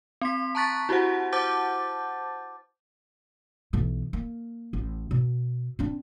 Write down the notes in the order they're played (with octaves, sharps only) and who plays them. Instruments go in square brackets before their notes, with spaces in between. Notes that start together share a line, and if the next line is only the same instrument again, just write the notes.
[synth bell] C4 C6 B6
A5 A#5 C#6 F#6 A6 B6
E4 F#4 G4 C5 F#5
C5 F#5 A5 D6 G6 A6
[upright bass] B1 E3
A#3
A1
B2
C4 D4